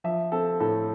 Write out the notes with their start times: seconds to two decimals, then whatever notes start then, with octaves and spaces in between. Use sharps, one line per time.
0.04 F3 E5
0.32 C4 A4
0.60 A2 A4